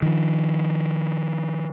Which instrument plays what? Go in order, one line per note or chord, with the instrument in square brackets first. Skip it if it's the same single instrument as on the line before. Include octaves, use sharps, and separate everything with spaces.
[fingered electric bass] D#3 F3